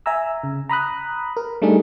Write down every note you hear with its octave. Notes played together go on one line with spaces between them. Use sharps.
E5 G#5 A#5 E6
C#3
A#5 B5 D#6 F#6
A#4
G3 A3 D4 D#4 G#4